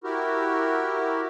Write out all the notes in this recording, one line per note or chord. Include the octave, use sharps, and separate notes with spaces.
E4 F#4 G4 A#4